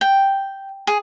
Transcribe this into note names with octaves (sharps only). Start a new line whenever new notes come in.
G5
G#4